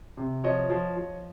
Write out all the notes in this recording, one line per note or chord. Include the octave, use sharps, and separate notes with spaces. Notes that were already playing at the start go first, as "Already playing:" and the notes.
C3
F3 C#5 D#5
F3
F3